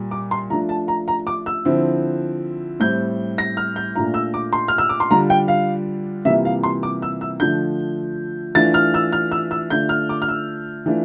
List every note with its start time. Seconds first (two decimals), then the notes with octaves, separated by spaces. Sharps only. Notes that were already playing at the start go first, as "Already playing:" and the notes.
Already playing: A#2 G3
0.11 D6
0.31 C6
0.50 F3 A3 D4 F4 A#5
0.69 A5
0.88 A#5
1.08 A#5
1.27 D6
1.46 E6
1.65 D3 F3 C4 E4
2.80 A2 G3 C4 G6
3.38 A#6
3.57 F6
3.76 G6
3.96 A#2 A3 D4 F4 A#5
4.14 E6
4.34 D6
4.53 C6
4.68 F6
4.78 E6
4.89 D6
5.00 C6
5.10 D3 G3 D4 F4 A#5
5.30 G5
5.48 F5
6.25 C3 E3 G3 A#3 F4 E5
6.45 F5
6.63 C6
6.83 D6
7.02 E6
7.21 E6
7.40 D3 F3 A3 D4 G6
8.55 E3 A3 D4 F4 A6
8.74 F6
8.94 E6
9.13 F6
9.32 E6
9.51 E6
9.70 D3 A3 D4 F4 G6
9.89 F6
10.09 D6
10.22 F6
10.29 E6
10.86 E3 A3 D4 F4